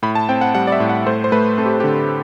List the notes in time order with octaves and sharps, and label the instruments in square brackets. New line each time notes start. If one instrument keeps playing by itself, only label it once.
[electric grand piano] A2 B5
A5
C4 G5
F#5
G3 F#5
D5
E5
A2
F#5
A3 C5
C5
A3 B4
C4 A4
G4
D3 G4